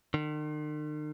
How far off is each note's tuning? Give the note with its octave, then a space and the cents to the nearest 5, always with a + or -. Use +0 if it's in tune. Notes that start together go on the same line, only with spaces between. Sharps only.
D#3 -45